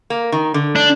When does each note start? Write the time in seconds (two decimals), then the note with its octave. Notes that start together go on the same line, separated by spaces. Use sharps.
0.10 A#3
0.32 D#3
0.54 D3
0.76 D4